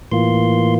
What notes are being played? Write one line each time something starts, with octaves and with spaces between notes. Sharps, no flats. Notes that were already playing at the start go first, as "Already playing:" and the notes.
A2 E3 A#3 F4 C6